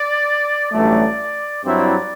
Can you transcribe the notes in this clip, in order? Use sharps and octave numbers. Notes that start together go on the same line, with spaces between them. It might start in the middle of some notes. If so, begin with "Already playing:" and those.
Already playing: D5
A1 G2 F#3 A3 D5
G2 F#3 C4 E4 D5